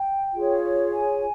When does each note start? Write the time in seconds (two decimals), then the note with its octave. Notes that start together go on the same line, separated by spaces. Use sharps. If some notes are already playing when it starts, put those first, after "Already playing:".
Already playing: G5
0.33 F4 G#4 C#5
0.91 G#5